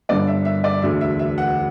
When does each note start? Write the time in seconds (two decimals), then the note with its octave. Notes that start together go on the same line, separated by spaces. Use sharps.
0.09 G1 G2 D3 D5
0.27 E5
0.45 E5
0.64 D5
0.82 E1 D2 D3 E5
1.01 E5
1.19 E5
1.38 F#5